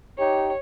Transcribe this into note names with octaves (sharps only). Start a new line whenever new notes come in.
D#4 G4 C#5